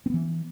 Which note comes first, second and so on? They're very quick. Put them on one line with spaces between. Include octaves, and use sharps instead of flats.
C4 B3 E3